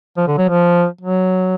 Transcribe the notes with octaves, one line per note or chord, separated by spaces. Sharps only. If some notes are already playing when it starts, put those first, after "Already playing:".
F3
D3
F#3
F3
F#3